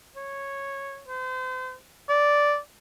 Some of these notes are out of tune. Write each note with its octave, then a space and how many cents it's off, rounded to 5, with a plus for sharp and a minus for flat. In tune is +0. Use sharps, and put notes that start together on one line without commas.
C#5 -10
C5 -35
D5 -5